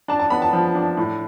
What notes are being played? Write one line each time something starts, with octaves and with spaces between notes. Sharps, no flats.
D4 A5
A5
B3 B5
A5
F3
D4
A2